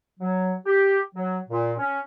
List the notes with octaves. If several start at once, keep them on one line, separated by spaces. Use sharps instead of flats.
F#3
G4
F#3
A#2
C#4